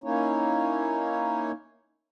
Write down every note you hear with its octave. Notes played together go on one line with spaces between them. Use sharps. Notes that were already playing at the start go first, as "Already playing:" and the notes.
A#3 C#4 D#4 E4 C#5